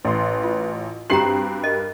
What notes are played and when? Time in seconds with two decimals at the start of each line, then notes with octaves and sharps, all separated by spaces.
0.05 A1 B4 C6
0.43 F4
1.10 G2 C4 F#4 G4 A#5 C7 F#7
1.64 A#4 D#5